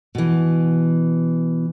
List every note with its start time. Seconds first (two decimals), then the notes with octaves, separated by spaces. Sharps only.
0.15 B2 E3